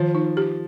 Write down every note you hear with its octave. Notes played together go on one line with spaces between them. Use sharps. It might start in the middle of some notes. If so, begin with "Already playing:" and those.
Already playing: D#3 F3
D#4
G4